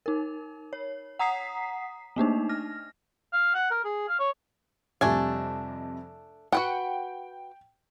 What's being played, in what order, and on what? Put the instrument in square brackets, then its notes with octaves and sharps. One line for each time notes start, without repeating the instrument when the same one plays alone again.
[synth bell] D#4 A#4
C#5
F#5 A#5 D#6 B6 C7
A3 A#3 D4 D#4
F6 A#6
[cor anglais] F5
F#5
A#4
G#4
F5
C#5
[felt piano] F2 C3 G3 [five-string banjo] A3 D4 G#5
[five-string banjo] F#4 B4 F#5 [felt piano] G5